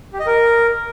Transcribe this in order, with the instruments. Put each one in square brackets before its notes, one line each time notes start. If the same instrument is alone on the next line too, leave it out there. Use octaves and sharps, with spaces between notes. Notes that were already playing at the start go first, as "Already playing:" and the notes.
[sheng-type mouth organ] G4
D#5
A#4